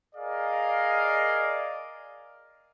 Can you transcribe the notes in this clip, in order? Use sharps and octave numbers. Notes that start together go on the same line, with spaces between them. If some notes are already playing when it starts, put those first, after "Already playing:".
G#4 A#4 D5 D#5 F5